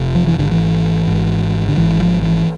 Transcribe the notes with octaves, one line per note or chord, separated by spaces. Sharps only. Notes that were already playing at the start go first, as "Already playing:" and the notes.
Already playing: F1 F2 C3
F3
E3
G#1 G#2 D3
E3
G#1 G#2
D3
G#1 G#2 E3
F3
E3